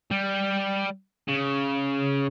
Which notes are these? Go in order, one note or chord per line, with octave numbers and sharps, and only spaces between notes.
G3
C#3